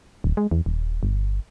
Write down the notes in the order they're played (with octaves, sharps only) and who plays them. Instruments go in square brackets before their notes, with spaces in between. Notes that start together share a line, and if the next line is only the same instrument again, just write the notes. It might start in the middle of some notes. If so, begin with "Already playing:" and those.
[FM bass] D1
G#3
E2
D#1
G1